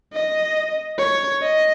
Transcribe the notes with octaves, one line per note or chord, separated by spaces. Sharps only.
D#5
C#5
D#5